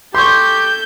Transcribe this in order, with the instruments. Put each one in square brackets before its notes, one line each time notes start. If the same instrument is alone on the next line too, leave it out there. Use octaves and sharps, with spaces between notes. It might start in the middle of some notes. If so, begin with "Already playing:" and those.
[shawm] G4 [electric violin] A4 G6 [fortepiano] C6 C#6